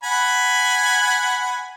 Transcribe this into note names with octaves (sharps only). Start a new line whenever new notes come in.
F#5 G#5 B5